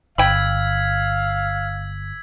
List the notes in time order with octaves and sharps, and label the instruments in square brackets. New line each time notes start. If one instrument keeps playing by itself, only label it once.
[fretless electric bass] G1 [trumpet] F5 [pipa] G5 B5 [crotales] E6 G#6 B6